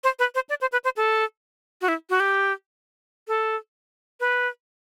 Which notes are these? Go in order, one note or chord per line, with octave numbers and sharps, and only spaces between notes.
C5
B4
C5
D5
C5
B4
C5
A4
F#4
E4
F#4
G4
A4
B4